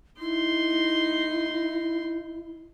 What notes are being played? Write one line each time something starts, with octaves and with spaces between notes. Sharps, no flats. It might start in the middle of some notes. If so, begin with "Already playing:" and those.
D#4 E4 C6